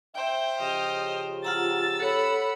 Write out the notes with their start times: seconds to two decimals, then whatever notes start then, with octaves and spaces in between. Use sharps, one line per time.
0.15 C5 E5 G5
0.59 C#3 F3 G4 D#5 F6
1.45 F4 F#5 A#5 E6 A6
2.00 A4 C#5 F#5 B5